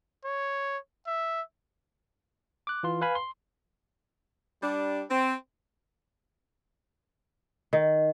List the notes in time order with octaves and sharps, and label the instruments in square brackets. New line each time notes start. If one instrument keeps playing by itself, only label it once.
[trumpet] C#5
E5
[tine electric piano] D6 F#6
E3 F4 C6
B4 F5 G#5 B5
C6
[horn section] G3 D4
C4
[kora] D#3